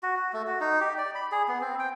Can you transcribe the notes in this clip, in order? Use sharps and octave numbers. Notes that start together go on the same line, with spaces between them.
F#4
F#4
A3
F#4
D#4
G4
D5
B5
G#4
B3
C4
G5